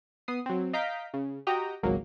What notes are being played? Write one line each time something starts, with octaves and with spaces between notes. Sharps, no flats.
B3 D#6 C7
F#3 C4
D#5 F5 A#5 G6 B6 D7
C#3
F#4 G4 D#5 G5 A#5
G#1 C#2 F#3 A#3